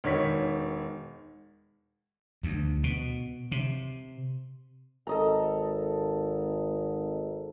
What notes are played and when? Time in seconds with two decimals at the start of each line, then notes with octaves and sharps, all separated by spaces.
0.04 E1 D#3 C#5 B6
2.43 D2
2.83 B2
3.52 C3
5.07 G#1 A4 D#5 A#5